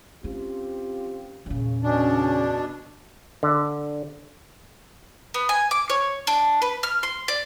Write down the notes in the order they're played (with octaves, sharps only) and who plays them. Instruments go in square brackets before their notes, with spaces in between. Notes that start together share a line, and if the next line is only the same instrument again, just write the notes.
[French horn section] C4 F4 G4 [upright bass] C#4
[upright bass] E2 A#2 [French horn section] C#3
[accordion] B2 D4 [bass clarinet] C#4
[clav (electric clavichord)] D3
[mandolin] B3
G#5
D6
C#5
D4
B4
F6
C6
D5